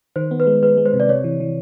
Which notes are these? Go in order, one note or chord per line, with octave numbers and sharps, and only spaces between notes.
D#3 C5
B3
B4
G#3
G#3 B4
G#3
C5
C3
D5
C3 C#5
E3
E3